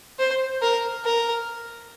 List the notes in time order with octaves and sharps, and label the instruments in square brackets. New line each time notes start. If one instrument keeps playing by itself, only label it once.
[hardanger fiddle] C5
A#4
A#4